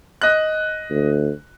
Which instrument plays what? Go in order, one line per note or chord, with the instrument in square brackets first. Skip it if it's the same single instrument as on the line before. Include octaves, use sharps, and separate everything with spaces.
[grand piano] D#5 F#6
[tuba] D2